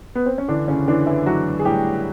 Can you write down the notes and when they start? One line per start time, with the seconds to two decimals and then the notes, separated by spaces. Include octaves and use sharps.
0.15 B3
0.26 C4
0.38 C#4
0.48 D3 E3 D4
0.68 C#3 C#4
0.87 D3 E3 D4
1.07 E3 E4
1.26 E3 F#3 F#4
1.59 G#4
1.65 A2 G3 G4